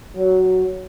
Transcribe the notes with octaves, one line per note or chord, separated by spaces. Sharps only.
F#3